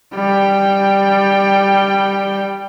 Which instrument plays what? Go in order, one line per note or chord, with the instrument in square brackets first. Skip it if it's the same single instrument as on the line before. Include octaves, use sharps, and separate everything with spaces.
[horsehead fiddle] G3 G5